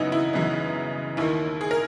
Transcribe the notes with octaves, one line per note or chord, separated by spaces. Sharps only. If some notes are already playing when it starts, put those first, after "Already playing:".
Already playing: F#2 C#3 E3 B3 D#4 E4 F#4
E4
F#2 C#3 E3 B3
D#2 D#3 A#3 E4
G#4
A#4